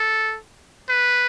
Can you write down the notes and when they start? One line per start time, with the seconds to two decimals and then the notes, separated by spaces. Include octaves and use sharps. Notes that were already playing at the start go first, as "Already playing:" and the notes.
Already playing: A4
0.89 B4